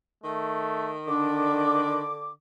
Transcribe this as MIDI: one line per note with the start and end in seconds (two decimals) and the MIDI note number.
0.24 2.10 51
0.24 0.93 57
1.08 2.31 50
1.08 2.06 62
1.08 2.00 74
1.08 2.31 86